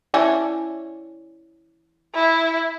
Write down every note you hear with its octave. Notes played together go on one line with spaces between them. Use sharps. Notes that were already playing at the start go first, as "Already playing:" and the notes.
E3 C#4 D4
E4